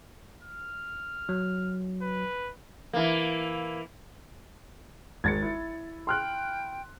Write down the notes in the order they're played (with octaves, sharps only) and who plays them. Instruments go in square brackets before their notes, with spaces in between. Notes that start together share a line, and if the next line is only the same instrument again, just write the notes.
[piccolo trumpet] F6
[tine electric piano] F#3
[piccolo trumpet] B4
[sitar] E3 A#3
[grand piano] G#1 [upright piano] G#6 A6 C#7
[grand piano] E4
[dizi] G5 [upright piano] C6 F6 F#6